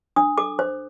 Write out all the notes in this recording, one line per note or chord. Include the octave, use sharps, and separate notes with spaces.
D4 D#6
A4 D6
C5